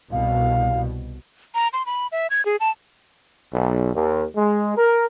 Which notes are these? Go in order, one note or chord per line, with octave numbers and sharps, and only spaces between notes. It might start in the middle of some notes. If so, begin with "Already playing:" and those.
C2 B2 F5
A#5
C6
B5
E5
G#6
G#4
A5
B1
D#2
G#3
A#4